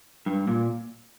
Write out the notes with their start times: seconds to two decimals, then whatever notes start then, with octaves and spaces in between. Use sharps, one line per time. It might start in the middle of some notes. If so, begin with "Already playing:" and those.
0.26 G2
0.48 A#2